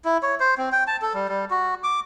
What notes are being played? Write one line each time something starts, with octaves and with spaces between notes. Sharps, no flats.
E4
C#5
C5
C4
G5
A5
A4
G3
G3
F#4
D6